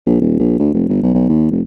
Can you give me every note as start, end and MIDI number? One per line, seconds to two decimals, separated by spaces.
0.06 0.18 34
0.21 0.37 27
0.39 0.55 34
0.59 0.72 38
0.74 0.84 29
0.89 1.00 31
1.02 1.12 35
1.14 1.25 35
1.29 1.49 39
1.51 1.61 29